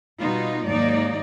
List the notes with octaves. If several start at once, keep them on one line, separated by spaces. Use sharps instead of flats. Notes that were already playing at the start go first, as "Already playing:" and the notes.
B2 G3 B3 D#4 F4
D#2 G#2 F#3 A#3 D#4 D5